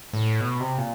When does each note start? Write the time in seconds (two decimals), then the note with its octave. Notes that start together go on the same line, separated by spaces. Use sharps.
0.13 A2
0.40 B2
0.60 C3
0.78 A#2